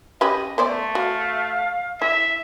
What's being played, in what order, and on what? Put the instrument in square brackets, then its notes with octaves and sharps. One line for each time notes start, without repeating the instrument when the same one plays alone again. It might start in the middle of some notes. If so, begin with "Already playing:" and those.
[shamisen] C#4 G4 B4 [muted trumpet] D#5
[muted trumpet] A3 [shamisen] B3 C5 D5
[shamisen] F#4 [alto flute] F5
[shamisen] E4 [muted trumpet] E5